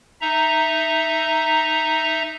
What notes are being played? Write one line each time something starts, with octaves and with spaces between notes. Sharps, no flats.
D#4 E5 A#5